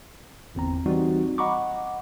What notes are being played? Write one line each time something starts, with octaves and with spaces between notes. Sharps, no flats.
G1 E2 C4 A#5
E3 G3 C4 D#4 F#4
D#5 F#5 A#5 B5 C#6 D6